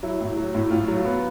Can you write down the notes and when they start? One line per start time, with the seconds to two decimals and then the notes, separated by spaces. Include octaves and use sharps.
0.03 F#3 E4
0.21 A2
0.37 F#3
0.55 A2
0.71 A2 F4
0.88 F#3
1.05 B3